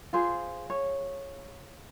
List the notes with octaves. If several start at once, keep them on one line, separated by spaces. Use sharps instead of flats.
F4 G#4 C5
C#5